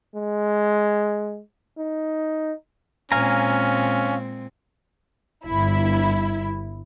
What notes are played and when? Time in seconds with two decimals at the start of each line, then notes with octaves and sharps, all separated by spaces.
0.15 G#3
1.78 D#4
3.12 A#2 G#3 C4 C#4 F5 G#5 A#5
5.45 G1 E4